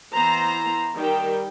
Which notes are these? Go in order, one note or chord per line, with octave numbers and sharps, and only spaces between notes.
E3 B3 C5 A#5
D#3 G3 G4 G5